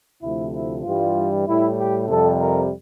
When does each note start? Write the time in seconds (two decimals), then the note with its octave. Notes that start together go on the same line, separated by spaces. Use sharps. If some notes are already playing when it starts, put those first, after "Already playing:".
0.21 D2 C3 F3 A3 E4
0.52 E4
0.84 G2 E3 G3 F4
1.47 A2 G3 E4
1.77 G4
2.08 F2 C3 G3 A4
2.40 A#4